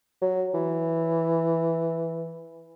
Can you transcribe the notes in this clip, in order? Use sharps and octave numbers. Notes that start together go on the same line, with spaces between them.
F#3
E3